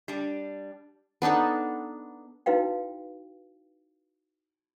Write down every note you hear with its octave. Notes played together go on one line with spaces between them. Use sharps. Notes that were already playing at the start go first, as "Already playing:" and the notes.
G3 D4
B3 D4 D#4 A4
D#4 E4 F#4 B4 F5 G5